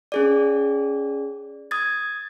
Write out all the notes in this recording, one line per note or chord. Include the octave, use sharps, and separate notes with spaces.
C#4 G#4 D5
D#6 G#6 A6